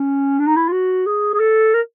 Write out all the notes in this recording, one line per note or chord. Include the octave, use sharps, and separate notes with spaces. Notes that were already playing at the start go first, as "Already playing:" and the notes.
Already playing: C#4
D4
D#4
E4
F4
F#4
G#4
G#4
A4
A#4